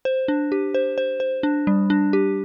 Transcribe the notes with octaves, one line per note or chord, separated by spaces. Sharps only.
C5
D4
G4
C5
C5
C5
D4
G3
D4
G4